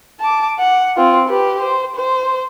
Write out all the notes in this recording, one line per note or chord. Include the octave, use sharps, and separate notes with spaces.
A5 D6
F#5
C4 F4
G4 B4
C5
C5